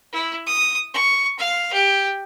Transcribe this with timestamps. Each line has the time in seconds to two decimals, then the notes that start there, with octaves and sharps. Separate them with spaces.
0.12 E4
0.47 D#6
0.94 C#6
1.39 F5
1.73 G4